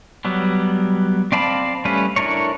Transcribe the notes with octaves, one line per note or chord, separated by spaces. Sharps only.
F#3 G3 B3
C4 D5 F5 A5 B5
G3 A3 C#4 B4
D4 E4 A4 A#4 C#5